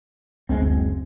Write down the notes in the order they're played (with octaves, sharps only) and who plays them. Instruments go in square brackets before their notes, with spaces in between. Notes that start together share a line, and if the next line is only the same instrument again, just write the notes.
[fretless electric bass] F#1 G#3 C4 [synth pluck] D2